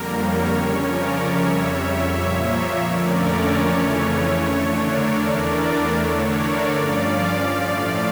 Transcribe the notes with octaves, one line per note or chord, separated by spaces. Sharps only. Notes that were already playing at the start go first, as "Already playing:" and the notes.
Already playing: F2 D3 G3 A#3 A#4
C#5
C#3 F3 C#4
A#4 D5
F2 C#3 G3 C#5 E5
C#5 E5
A#2 F3 A#3
F2 D3 F3 A3 C#4 A#4 D5
C#5
F2 C#3 E3 A3 C#4
C#5
D3 A3 D4
A#4 D5
E2 E3 A3 D4 A#4 D5
A#4
D3 A3 D4 C#5
A#4 D5
G2 F3 C#4 D5 F5
A2 F3 A3